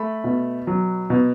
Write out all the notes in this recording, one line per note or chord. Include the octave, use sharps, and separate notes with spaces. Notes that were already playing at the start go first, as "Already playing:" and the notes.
Already playing: A3 B5
B2
F#3
B2